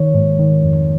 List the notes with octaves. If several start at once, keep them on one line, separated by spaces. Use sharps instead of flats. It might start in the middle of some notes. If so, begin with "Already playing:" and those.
Already playing: D#3 C#5
G#2
D#3
F2